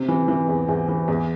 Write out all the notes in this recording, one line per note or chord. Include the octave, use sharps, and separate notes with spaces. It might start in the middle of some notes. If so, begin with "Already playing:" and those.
Already playing: C3
E3
E3
E2
E2
E3
E2